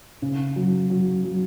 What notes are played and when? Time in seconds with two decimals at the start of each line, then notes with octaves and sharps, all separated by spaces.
0.22 C#3
0.56 F#3
0.90 F#3
1.24 F#3